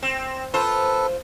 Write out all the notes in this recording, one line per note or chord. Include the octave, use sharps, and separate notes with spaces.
C4
F4 A4 B4 C5